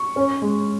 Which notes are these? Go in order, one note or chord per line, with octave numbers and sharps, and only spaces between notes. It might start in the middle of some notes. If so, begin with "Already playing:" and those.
Already playing: C#6
C#4
G#3